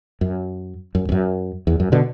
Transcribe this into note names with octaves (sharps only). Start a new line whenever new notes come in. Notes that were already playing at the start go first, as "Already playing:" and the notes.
F#2
F#2
E2
F#2
E2
F#2
B2 D3